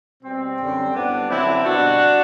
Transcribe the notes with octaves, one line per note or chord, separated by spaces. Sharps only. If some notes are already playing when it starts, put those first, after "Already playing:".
B2 G3 C4
F#2 D3 G3
A2 G3 B3 D4
F#2 D3 F#3 C4 E4
B2 G3 D4 F#4